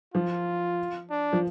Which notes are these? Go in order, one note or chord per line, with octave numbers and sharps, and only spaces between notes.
F3 F4
D4
F3